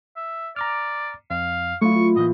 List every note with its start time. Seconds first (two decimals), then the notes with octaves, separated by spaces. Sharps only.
0.17 E5
0.56 D5 A#5 D6 F6
1.31 F2 F5
1.81 F#3 A3 E4 F4 C#6
2.16 A2 E3 A#3 D#5